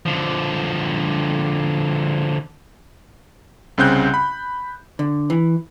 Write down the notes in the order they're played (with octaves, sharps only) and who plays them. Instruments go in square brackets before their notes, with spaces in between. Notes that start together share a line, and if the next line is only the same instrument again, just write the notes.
[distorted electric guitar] D3 F3
[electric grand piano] C2 C#3 C4 F#6 G6
B5
[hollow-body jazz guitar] D3
E3